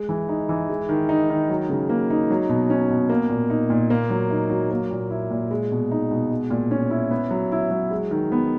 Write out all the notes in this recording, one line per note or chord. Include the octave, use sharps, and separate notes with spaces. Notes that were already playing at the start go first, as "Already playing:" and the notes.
Already playing: G#3
E3
D#4
E3
G#3
D#3
D#4
D#3
F#3
C#3
A#3
D#4
F#3
B2
C#4
B2
A#3
A#2
D#4
A#2
A#3
F#3
D#4
F#3
A#3
A#2
E4
A#2
G#3
B2
D#4
B2
G#3
A#2
C#4
E4
B3
F#3
E4
F#3
G#3
D#3
B3